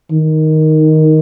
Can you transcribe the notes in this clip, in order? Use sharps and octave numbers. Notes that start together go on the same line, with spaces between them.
D#3